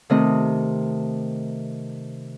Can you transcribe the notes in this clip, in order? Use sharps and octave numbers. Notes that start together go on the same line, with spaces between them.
C3 D#3 A3 C4 D#5